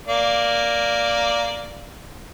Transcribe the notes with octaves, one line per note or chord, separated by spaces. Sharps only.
A#3 D5